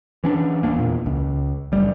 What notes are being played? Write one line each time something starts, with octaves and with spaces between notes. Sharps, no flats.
E3 C#4 D4
D1 A#3 D4
E2 A#2
C#2
F#1 G3